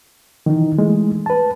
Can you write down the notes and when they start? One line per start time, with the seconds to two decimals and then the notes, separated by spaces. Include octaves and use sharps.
0.46 D#3 E3 D#4
0.78 E3 G#3 A3
1.26 B4 A5